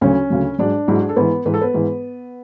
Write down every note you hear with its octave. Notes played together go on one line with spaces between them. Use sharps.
D2 C#3 F#3 C#4 C#5
D2 C#3 F#3
G#2 F#3 D4 D5
G#2 F#3 E4
F#4
G#4
A4
G#2 E3 B3 B4
G#2 E3 B4
A4
B3 B4
G#2 E3